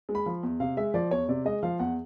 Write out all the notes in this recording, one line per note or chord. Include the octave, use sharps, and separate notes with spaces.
G#3
B5
F3
E2
C3 F5
G#3 E5
F3 D5
E2 C#5
C3 D5
G#3 D#5
F3 F5
E2 F#5